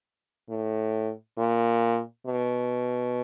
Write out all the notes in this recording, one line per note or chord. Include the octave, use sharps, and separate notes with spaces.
A2
A#2
B2